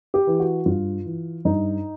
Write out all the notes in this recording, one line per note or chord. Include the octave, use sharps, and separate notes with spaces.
G4
E3
F#4
G2 F4
E3
G2 D#4